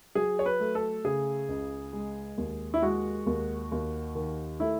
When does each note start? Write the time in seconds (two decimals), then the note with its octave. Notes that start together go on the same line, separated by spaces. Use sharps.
0.15 F#3 G#4
0.39 C#5
0.46 B4
0.60 A3
0.75 A4
1.04 C#3 G#4
1.49 C#2
1.93 G#3
2.38 D#2
2.74 E4
2.82 G#3 F#4
3.27 D#2
3.72 D#2
4.15 D#3
4.60 A3 E4